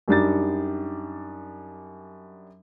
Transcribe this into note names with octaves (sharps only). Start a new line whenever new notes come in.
F#2 G3 D4 D#4 A6